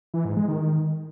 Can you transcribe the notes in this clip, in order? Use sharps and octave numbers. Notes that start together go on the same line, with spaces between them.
E3
G#2
G#3
D#3